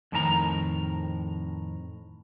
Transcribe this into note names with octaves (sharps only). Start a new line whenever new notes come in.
F2 A2 D#3 A#4 A5 A#5